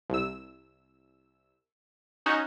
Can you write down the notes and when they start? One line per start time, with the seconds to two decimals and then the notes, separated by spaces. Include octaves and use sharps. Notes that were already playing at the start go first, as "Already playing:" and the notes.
0.10 C2 E6
2.26 C#4 D#4 F#4